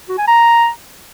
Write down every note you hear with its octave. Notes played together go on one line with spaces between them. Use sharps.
F#4
G#5
A#5